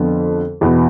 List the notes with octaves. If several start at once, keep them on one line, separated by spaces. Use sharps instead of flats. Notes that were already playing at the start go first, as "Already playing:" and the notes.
Already playing: F2 D3 F3 B3
E2 B2 B3